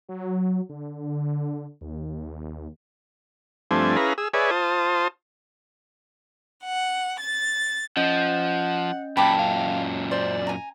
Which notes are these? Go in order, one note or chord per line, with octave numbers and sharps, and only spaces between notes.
F#3
D3
D#2
G2 F3 A3 C4 D4 G#5
C#4 E4 G#4 B4 F5 A#5
G#4 E6
G#4 B4 C#5 D5 E5 G#5
F4 C5 A5 D#6
F#5
A6
F3 C#4 D#5 F#5 G6
F#2 A#2 G5 A5 B5 D6
F5
C5 D5
G#5 A#5